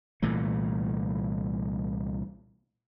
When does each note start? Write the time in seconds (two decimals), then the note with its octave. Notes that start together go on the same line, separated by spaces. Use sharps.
0.22 C2 A#2 E3 A3